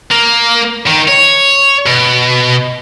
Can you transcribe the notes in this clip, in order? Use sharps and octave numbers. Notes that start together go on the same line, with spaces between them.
A#3
D#3
C#5
B2